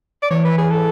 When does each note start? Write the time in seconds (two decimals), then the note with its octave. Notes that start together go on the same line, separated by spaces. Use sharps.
0.23 D5
0.31 E3 C#5
0.45 B4
0.58 G#4
0.71 A4